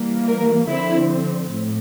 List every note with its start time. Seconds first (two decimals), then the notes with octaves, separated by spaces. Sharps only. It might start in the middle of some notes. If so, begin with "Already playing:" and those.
Already playing: E3 G3 A#3
0.27 A#4
0.68 D3 F3 C4 E4
1.50 A2